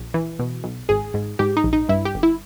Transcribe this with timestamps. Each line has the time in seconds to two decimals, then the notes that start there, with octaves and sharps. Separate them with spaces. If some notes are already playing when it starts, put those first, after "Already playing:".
Already playing: A#1
0.14 E3
0.39 B2
0.64 B1
0.89 G#1 G#4
1.14 G#2
1.39 G#2 G4
1.57 D#4
1.64 A#1
1.73 D#4
1.89 G2 E4
2.05 G4
2.15 G1
2.23 E4